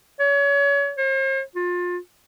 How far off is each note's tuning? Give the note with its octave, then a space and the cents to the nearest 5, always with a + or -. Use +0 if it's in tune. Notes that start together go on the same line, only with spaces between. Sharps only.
C#5 +30
C5 +45
F4 +25